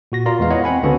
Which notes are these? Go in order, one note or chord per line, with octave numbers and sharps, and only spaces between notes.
A#2 F#4 A#6
F4 A#4 D5 A#5 C6
E2 E3 G#3 F5
B3 E4 C#5 D#5 F#5
C4 F#5 G#5 B5
C#2 D3 B3 C#4 F#4 A4